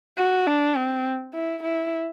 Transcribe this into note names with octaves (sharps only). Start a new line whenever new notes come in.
F#4
D4
C4
E4
E4